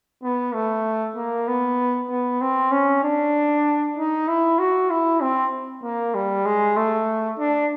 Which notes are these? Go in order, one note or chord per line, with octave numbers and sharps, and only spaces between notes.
B3
A3
A#3
B3
B3
C4
C#4
D4
D#4
E4
F#4
E4
C4
A#3
G3
G#3
A3
D4